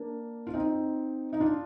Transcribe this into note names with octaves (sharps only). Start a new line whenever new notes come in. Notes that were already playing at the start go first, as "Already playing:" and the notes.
Already playing: A#3 D4
F4
C4 D#4
D#4
D4 F4